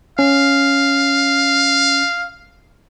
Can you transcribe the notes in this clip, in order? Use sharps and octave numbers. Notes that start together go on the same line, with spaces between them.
C#4 F5